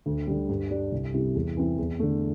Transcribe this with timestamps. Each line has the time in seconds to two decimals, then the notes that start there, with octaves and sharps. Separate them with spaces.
0.06 D2
0.27 D3 G3
0.49 G2
0.71 G3 D4
0.92 C2
1.14 C3 G3 E4
1.35 E2
1.57 E3 C4 E4
1.78 E2
1.99 D3 A3